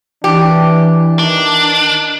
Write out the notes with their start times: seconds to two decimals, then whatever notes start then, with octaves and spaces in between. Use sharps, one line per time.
0.24 E3 D4 G4
1.19 D#3 D4